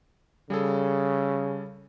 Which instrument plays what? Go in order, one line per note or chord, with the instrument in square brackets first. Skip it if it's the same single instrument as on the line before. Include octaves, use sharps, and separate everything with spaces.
[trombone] C#3 [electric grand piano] G3 G#4 A4